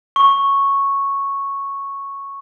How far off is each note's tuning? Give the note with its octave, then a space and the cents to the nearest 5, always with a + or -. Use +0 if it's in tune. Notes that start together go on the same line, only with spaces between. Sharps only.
C#6 -5